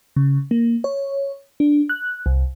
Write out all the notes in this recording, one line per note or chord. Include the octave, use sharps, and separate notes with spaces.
C#3
A#3
C#5
D4
F#6
C2